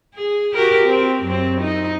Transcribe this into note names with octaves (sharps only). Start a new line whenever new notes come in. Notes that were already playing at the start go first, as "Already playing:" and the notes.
G#4
F#4 G4 A#4
C4
F#2 C4
D#4